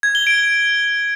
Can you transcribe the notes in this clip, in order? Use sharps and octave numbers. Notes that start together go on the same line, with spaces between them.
G#6
G7
D7